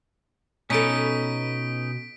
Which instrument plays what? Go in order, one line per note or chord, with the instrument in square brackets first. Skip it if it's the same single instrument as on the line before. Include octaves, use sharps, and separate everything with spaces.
[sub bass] B2 [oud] B3 A4 [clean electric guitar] C#4 D#4 [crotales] B6 D7